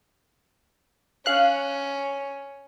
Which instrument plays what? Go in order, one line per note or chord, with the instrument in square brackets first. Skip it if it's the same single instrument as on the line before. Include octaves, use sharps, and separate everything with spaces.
[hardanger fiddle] C#4 [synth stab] F5 F#6